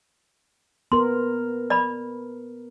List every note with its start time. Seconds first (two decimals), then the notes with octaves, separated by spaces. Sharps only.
0.92 B3 A#4 C6
1.70 D5 B5